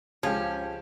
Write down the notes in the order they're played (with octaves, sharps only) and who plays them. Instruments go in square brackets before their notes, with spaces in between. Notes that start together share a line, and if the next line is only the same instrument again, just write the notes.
[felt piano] C#2 [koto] F3 [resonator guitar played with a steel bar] C#4 [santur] G4 A5